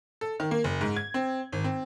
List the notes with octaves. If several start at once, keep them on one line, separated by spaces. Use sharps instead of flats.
A4
D#3
A#3
F#1
G#2
G#6
C4
G#1
C4